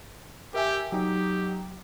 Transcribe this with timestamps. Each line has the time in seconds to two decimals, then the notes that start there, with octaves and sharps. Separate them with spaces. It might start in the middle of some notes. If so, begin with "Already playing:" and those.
0.54 G4 A#4 E5 G#5
0.92 F#3 D#4 G4